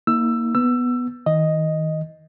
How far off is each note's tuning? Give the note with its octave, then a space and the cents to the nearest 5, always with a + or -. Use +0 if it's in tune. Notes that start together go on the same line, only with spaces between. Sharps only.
A#3 +0 D#4 +45 E6 +15
B3 +0 E6 +20
D#3 +35 D#5 +0